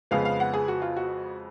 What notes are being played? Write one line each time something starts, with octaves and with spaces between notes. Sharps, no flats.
F2 C#3 G#3 B3 F5
F5
F#5
G#4
F#4
F4
F#4